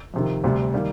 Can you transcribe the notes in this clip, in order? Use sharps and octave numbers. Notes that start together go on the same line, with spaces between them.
F2 C3 D#3
D2 C3 G3
D#3 G3 A#3